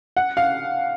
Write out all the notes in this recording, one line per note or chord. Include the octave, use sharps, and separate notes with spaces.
F#5
F5